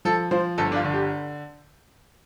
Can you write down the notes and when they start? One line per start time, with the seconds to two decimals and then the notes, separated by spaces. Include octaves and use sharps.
0.05 F3 A4
0.31 F3 C5
0.58 G1 A4
0.72 D4
0.76 F4
0.84 D3
0.93 G4